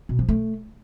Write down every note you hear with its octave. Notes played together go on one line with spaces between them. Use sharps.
B2
F3
A3